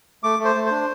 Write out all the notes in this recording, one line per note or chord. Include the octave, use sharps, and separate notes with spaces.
A3 D6
A3
C5
A3
D4 C5